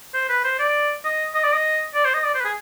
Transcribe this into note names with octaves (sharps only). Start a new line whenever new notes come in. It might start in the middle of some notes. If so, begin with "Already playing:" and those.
C5
B4
C5
D5
D#5
D#5
D5
D#5
D5
C5
D#5
D5
C5
B4
G#4